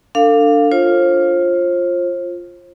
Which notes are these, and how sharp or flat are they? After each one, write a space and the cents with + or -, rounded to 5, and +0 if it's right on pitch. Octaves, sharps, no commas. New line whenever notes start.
D4 +0 A4 +40 F5 +0
F4 +0 C5 +35